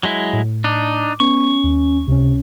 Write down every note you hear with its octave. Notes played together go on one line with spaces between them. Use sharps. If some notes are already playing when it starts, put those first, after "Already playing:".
F#3 G#3 E4
A2
D4 D#4 D6
B3 C#4 C#6
D#2
C#2 C3 C#4